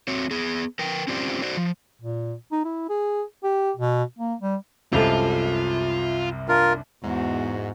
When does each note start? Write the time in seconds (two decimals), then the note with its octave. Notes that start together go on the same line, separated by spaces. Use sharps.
0.08 F#3 C4 F#4 C#5
0.31 B3 G#4
0.79 A#4 B4 G5
1.08 C4 C#4 F4 G4 C5 D5
1.42 F#4 C5 D5
1.57 F3
2.02 A#2
2.52 D#4
2.65 E4
2.89 G#4
3.44 G4
3.77 B2
4.19 A#3
4.41 G3
4.93 C2 F#2 C3 G#3 F4 A4
6.49 D4 F4 A#4
7.03 E2 G#2 F#4